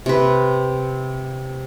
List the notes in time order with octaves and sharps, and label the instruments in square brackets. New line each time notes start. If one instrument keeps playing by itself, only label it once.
[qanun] C3 B4